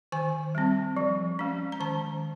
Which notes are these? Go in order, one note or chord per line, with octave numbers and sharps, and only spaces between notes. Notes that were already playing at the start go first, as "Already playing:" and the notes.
D#3 G#5
G3 C4
F3
G#3 C#4
A#5
D#3 A5